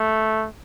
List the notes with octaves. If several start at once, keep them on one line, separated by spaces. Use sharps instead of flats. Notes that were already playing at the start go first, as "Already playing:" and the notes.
Already playing: A3